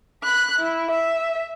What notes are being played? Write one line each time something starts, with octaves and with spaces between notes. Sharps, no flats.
B5 F#6
E4
E5